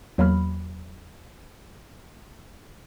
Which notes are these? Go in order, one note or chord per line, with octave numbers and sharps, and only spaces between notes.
E2 F#3 A#3 B5 F6